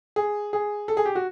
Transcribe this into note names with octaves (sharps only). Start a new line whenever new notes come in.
G#4
G#4
A4
G#4
G4
F#4